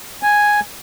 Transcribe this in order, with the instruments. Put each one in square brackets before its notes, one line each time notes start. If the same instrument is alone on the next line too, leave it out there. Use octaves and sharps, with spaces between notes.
[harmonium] G#5